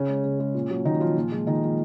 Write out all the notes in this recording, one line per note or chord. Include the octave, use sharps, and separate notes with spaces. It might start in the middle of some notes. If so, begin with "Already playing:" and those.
Already playing: C#3 C#4
G#3
C#3
G#3
A#2
F#3
A#2 D#3 D#4
F3 F#3 F4
A#2
F3 G#3
A#2 D#3 D#4
F3 G#3